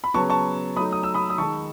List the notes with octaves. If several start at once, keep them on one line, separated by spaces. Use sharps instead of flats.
B5
C#3 F#3 B3 A5 C#6
A5 C#6
F#3 A3 D#4 B5 D#6
D#6
E6
B5 D#6
D#6
D#3 G#3 D#4 A5 C#6